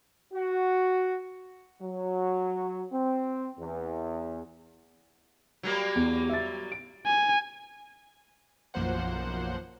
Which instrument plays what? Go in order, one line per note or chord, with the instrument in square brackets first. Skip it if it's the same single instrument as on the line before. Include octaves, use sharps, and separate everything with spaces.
[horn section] F#4
[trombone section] F#3
C4
E2
[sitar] F#3 G3 A#3
[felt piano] E2
E5 A6
D7
[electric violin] G#5
[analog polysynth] B1 F#2 F3 A#3 C5 F#5